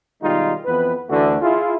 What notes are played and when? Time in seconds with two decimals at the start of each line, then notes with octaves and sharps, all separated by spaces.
0.22 B2 D#3 G3 G#3 D#4 F4
0.66 F2 E3 B3 B4
1.10 D2 D3 E3 A3 D4 F#4
1.42 E4 F4 G#4